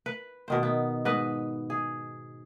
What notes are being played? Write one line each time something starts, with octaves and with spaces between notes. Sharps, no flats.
B4
B2 D#3 C5
B3
G#2 B4 D#5
G#4